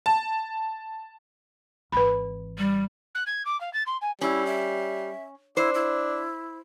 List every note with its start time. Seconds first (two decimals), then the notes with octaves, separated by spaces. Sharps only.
0.06 A5
1.92 G#1 E3 B4 B5
2.58 G3
3.14 F#6
3.26 G#6
3.45 D6
3.60 F5
3.73 A6
3.86 C6
4.01 G#5
4.21 G3 C#4 E4
4.46 E5
5.57 D4 E4 C5
5.74 E4